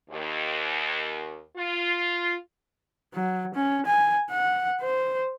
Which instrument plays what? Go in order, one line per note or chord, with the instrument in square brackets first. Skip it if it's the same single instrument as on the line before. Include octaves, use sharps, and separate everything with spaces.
[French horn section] D#2
F4
[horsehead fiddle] F#3
C#4
G#5
F#5
C5